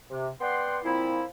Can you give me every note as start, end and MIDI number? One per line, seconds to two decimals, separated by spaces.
0.09 0.28 48
0.41 0.79 59
0.41 0.79 74
0.41 0.79 78
0.41 0.79 79
0.41 0.79 84
0.84 1.24 46
0.84 1.24 53
0.84 1.24 60
0.84 1.24 64